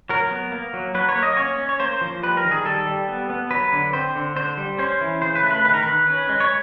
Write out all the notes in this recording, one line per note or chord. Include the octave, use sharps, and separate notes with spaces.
F#3 A#4
B3
A#3
F#3
F#3 B4
C#5
A#3
D#5
C#4 C#5
C#4
C#5
A#3 C5
F3
G3 B4
A#4
D#3
G#4
G3 A4
G3
B3
B3
F#3 B4
D3
C4 C5
D3
D3 C5
G3
C#4 C5
E3
C#3 C5
B4
A3
B4
D#3 B4
A#4
D#3 B4
C#4 B4
G#3
C#5